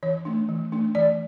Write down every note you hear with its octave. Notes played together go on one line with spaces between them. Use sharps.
E3 C#5
A3 D4
E3
A3 D4
E3 D5